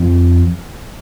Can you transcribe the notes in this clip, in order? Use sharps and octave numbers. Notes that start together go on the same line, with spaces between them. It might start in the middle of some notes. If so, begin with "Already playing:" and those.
Already playing: F2